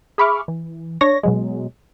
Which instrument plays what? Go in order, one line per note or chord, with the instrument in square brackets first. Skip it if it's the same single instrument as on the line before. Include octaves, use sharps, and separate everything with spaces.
[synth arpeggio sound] G#4 E5 B5 C#6 D6 F6
E3
D4 C#5 C#6 A#6
B2 F#3 G#3